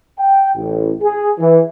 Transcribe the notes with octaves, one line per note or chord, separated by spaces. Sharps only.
G5
A1
G#4
E3